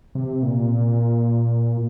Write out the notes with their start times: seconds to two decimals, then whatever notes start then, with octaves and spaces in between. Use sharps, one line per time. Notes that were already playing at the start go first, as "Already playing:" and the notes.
0.15 C3
0.43 A#2